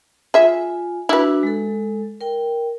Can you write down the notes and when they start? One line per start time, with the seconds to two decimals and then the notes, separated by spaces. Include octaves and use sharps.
0.34 F4 G#4 E5 G#5
1.09 D4 E4 F#4 B4
1.43 G#3 A4
2.21 A#4 G5